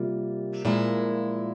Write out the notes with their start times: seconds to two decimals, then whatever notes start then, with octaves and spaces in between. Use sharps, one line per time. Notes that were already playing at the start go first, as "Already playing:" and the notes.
Already playing: C3 G3 A#3 F4 A#4
0.65 A#2 F3 G#3 E4 A#4